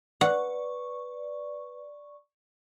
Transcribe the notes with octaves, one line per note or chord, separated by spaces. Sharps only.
B4 D5 F#5 C#6